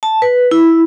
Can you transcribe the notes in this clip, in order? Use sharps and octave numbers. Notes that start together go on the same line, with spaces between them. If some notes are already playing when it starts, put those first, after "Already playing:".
A5
B4
E4